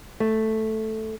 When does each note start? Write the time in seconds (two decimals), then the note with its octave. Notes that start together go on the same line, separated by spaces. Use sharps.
0.20 A3